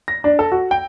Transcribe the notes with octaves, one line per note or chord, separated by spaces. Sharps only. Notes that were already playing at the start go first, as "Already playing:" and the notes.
A#6
D4
A4
F#4
G5